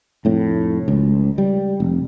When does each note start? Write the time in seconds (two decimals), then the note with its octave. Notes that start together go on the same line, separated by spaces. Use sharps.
0.25 F1 A2
0.88 C#2
1.38 G3
1.80 F1